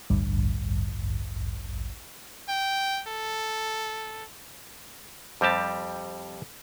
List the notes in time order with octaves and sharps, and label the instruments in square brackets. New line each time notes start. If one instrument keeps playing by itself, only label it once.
[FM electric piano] A1 D2 G2
[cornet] G5
A4
[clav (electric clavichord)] F2 G3 C4 G4 A5